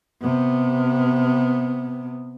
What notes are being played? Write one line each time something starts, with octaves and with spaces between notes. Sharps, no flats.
C3 B3